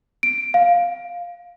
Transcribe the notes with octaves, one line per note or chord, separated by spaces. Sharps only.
D7
F5